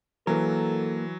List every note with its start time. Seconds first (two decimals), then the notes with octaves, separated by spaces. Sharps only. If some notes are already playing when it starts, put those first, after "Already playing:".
0.27 E3 F#3 A#3 A4 A#4